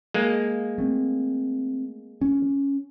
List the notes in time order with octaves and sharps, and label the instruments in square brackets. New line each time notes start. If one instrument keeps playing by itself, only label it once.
[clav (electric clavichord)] G#3 A#3
[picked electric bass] A3 C4
C#4